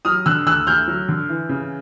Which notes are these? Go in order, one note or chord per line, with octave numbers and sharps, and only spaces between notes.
F#3 D#6 F6
D3 E6 F#6
D2 E6 F#6
D2 F6 G6
F#3
D3
E3
C#3